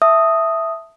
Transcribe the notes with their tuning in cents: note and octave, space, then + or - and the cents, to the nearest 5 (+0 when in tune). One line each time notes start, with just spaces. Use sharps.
E5 +0 A5 +0 D#6 +0